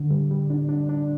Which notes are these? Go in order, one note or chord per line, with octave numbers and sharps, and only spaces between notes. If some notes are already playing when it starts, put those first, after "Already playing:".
Already playing: D3
G3
G3
D4
D4
D4